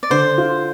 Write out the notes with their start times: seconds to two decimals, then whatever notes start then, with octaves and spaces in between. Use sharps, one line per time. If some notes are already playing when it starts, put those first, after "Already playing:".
0.03 D5
0.10 D3 C5
0.38 F4